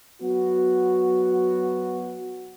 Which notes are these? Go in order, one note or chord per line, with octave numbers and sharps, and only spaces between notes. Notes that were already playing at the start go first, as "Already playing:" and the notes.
F#3 B3 F#4